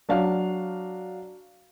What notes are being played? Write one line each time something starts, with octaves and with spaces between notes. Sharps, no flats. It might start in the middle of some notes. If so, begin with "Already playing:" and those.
F#3 D4 F5